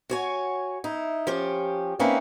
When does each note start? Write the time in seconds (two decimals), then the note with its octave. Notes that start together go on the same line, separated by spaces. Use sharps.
0.10 F#4 C#5 G#5
0.84 D#4 E4
1.27 F3 C#4 G4
1.99 A#3 C4 C#4 D#4 E4 B4